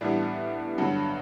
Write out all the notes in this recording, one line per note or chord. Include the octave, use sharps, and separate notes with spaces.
A2 E3 G3 B3 D4
G2 D3 F#3 F#4